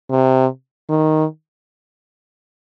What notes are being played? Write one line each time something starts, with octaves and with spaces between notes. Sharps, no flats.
C3
D#3